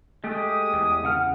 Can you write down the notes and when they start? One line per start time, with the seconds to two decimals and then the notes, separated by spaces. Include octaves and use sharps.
0.24 G#3 A3 G4 D#6
0.73 E2
1.04 C#3 F#5 F6